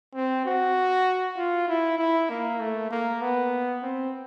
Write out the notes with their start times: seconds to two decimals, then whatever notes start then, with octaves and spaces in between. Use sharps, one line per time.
0.14 C4
0.45 F#4
1.37 F4
1.68 E4
1.98 E4
2.29 A#3
2.60 A3
2.91 A#3
3.21 B3
3.82 C4